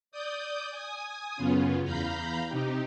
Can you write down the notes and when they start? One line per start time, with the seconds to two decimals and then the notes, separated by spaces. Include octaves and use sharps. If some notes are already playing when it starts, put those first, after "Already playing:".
0.12 D5 D#6 G6
0.71 G#5 D#6
1.36 F#2 C#3 B3 C#4 F4
1.84 E2 F5 A#5 B5 G6
2.48 C3 D#4 G4